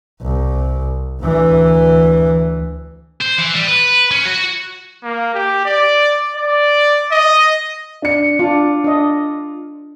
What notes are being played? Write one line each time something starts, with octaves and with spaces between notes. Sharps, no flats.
C2
D2 E3
C5
E3
G3
B4
C#4
F#4
A#3
G4
D5
D5
D#5
D4 C#7
D4 F4
D4 D#5